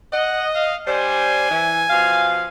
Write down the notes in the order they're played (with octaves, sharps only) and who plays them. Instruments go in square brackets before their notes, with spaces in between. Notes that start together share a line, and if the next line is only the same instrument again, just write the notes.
[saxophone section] D#5 [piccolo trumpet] F#5
[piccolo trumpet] F5
[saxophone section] G3 D4 C5 [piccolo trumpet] G#5
[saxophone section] E3
B2 F3 F5